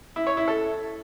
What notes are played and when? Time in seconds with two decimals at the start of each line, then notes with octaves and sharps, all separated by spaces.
0.16 E4
0.27 C#5
0.37 E4
0.48 A4